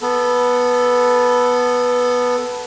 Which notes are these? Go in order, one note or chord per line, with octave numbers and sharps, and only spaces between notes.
B3 A4